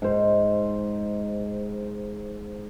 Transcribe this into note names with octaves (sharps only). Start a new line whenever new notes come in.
G#2 C5